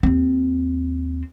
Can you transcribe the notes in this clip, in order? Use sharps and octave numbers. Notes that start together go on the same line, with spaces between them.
D#2 C4